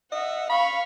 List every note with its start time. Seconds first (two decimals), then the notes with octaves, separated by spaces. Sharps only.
0.12 D#5 E5 F#5
0.50 F5 B5 C#6